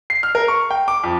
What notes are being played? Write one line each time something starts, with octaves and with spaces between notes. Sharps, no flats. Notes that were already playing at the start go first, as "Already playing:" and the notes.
C7
F6
A#4
C#6
G5
D6
F2